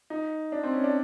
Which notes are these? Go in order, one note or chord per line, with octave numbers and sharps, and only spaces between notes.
D#4
D4
C4
C#4
D4